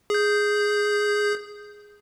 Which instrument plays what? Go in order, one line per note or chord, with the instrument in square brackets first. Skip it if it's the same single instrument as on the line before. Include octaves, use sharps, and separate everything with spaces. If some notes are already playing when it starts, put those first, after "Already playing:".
[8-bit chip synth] G#4 G6